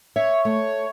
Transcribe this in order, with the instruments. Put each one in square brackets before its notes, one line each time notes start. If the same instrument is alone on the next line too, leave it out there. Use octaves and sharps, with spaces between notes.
[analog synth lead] C#5 [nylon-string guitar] E5
[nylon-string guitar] A3